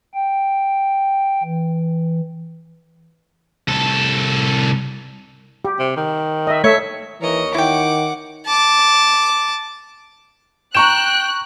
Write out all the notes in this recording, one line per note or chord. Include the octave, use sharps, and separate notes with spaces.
G5
E3
C2 A4
G4
C3
D#3
D#5 E5
A3 C#5 E5
D#2 E3 A#4 C#5 D#5
D#3 E4 F#5 G5 D6
A5 D6
G5 A#5 C#6 F#6 E7